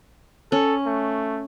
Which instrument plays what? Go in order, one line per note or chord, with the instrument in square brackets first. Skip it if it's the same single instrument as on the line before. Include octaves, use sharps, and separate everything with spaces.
[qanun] C#4 [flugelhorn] A4
[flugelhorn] A3